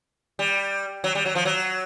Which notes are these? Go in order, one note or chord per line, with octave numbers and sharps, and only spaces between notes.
G3
F#3
G3
F#3
F3
F#3